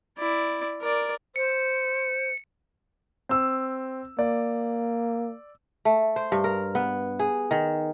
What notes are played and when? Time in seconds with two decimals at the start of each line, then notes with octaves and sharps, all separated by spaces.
0.18 E4 D5
0.81 A#4 D5
1.36 C5 C#7
3.29 C4 E6
4.19 A#3 D5
5.85 A3
6.16 C5
6.32 G2
6.44 A#4
6.75 B3
7.19 G#4
7.51 D#3